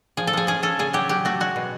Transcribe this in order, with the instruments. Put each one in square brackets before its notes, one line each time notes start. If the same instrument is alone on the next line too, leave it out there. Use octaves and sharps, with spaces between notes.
[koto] F3 G#4
A4
F3 G#4
C#4 G#4
C#4 A4
C#3 G#4
F#3 G4
F#3 G4
A3 F#4
G#3 F#4
B2